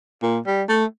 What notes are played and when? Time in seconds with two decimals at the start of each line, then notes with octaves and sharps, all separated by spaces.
0.23 A#2
0.47 G3
0.69 A3